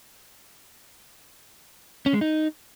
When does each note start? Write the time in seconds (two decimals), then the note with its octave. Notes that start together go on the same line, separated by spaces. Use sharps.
2.06 C#4
2.14 G#3
2.21 D#4